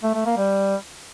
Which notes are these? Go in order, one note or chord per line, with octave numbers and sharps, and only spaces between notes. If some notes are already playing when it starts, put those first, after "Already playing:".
A3
A3
A#3
G3